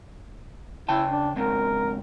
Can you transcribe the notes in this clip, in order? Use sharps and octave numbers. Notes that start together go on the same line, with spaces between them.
C#3 E4 G5 A5
D4
C#2 G#2 C4 A#4